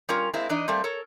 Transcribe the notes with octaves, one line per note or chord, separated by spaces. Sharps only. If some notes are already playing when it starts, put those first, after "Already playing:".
G3 C#4 F4 A#4
G#3 A#3 C4 E4
E3 D4 D#4 D#5
G3 A3 A#3 C4
A4 A#4 C#5